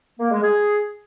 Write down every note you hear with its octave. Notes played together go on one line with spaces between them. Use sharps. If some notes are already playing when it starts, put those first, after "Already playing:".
A#3
G#3
G#4